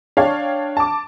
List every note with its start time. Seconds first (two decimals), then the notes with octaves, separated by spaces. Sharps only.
0.17 D4 C#5 F5 G5 A5
0.77 A5 D6